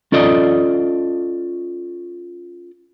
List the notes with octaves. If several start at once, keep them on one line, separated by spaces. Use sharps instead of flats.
C#4 F4 A4 D5 D#5